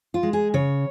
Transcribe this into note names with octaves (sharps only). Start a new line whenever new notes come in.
F4
G#3
G#4
C#3 C#5